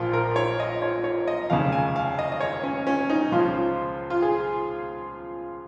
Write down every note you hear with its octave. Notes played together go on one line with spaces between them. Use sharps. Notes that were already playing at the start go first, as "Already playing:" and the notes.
Already playing: A#1 A#2 F3 F4 A#4
A#4
C#5
D#5
C#5
C#5
D#5
F1 D#2 C#3 F5
G#5
F5
D#5
D#5
C#5
C#4
C#4
D#4
C#2 C#3 F3 F4
F4
G#4